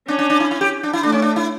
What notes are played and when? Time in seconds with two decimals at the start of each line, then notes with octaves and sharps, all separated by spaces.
0.08 C#4 D4
0.19 D4
0.30 D4
0.40 E4
0.51 E4
0.61 G4
0.83 D4
0.93 E4
1.03 A3 D4
1.12 C#4
1.22 D4
1.36 E4